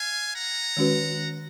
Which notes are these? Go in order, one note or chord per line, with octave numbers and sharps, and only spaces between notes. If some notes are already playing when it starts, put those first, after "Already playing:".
Already playing: F5 G#5
F#5 A#5
D#3 G#3 C#4 F#4 B4